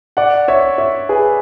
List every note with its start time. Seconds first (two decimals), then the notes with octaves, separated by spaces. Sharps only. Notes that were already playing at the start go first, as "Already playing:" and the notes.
0.17 D5 F#5
0.48 C#5 E5
0.78 C#5 E5
1.09 G#4 B4